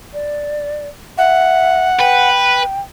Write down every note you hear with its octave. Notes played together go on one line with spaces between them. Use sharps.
D5
E5 F#5
B4 G5